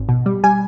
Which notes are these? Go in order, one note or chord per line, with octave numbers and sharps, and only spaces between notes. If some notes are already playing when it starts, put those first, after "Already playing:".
Already playing: G#1
B2
G3
G3 G#5